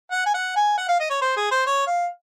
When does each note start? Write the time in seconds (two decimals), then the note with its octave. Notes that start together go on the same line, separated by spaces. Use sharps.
0.11 F#5
0.26 G#5
0.34 F#5
0.56 G#5
0.78 F#5
0.88 F5
1.00 D#5
1.10 C#5
1.21 C5
1.36 G#4
1.51 C5
1.66 C#5
1.87 F5